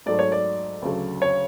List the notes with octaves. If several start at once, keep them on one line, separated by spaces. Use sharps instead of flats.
G#2 F#3 A3 D5
C#5
D5
D2 C#3 F#3 A3
C#5